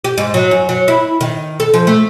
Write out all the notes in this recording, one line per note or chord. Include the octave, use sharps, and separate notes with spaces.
G4
G#2
F#3
F#2
F#3
E4
D#3
A4
F3
A3